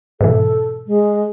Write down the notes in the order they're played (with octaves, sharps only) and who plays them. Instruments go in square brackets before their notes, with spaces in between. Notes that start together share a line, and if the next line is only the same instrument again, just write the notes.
[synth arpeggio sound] G#2 B2 E3 [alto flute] A4
[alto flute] G#3